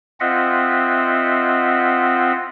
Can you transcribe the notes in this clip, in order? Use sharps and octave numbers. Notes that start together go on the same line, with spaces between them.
C4 F4 D#5 E5 F#5